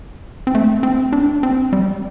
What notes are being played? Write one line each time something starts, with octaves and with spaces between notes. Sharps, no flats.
C4
A3
C4
D4
C4
G3